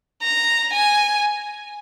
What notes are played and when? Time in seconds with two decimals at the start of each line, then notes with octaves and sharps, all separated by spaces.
0.23 A#5
0.72 G#5